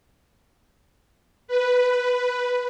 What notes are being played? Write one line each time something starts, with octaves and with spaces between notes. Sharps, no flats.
B4